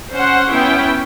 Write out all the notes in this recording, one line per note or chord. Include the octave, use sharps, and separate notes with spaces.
C#4 C5 F#5
B3 C#4 E4 G5